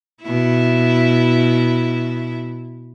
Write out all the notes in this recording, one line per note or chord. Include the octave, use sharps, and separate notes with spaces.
B2 E4